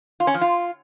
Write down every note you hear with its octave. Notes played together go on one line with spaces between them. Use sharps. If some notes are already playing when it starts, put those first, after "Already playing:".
F4
C#4
F3
F4